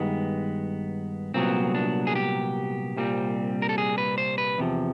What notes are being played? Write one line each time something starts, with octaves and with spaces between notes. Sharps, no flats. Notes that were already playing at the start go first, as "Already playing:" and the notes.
Already playing: G2 D#3 G#3 B3
C2 A#2 F#3 B3 C4
D4
G#4
G4
C2 A#2 G3 C4
A#4
A4
G#4
B4
C5
B4
E2 C3 F3